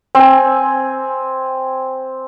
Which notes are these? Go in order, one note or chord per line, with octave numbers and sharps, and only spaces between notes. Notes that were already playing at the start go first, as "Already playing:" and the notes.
C4 G#5